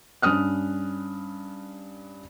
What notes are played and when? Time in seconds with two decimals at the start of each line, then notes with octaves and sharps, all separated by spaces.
0.22 G2 C#4 D#6 F6 F#6